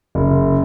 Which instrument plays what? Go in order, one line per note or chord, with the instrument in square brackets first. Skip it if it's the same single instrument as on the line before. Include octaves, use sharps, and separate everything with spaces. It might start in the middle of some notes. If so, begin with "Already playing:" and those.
[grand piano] F#1